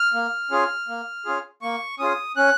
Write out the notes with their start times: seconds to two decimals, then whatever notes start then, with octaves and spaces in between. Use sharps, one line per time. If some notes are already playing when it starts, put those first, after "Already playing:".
Already playing: F6
0.14 A#3
0.51 C#4 F4 G#4
0.88 A#3
1.25 C#4 F4 G#4
1.62 A#3 C#6
1.99 C#4 F4 G#4 D#6
2.36 C#4 F#6